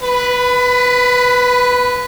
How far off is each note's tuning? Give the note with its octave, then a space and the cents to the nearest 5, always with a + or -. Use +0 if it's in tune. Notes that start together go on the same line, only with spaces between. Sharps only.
B4 +0 B5 +25